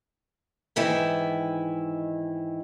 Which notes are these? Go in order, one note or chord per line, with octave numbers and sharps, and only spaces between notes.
G#2 D#3 E3 E4